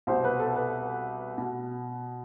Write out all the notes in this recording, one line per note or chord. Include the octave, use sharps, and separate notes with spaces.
C2 B2 C5
B4
A4
B4
B2